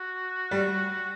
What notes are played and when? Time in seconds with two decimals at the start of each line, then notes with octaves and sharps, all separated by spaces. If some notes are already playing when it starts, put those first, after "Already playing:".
Already playing: F#4
0.51 G3